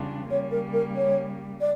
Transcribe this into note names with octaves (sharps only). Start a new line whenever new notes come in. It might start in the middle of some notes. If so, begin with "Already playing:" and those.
Already playing: E2 C#3 G3 D4 F4
C#3 G3 A#3 C#5
A#4
A#4
C#5
D5